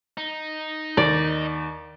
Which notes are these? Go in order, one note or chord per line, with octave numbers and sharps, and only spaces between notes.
D#4
D#2 D5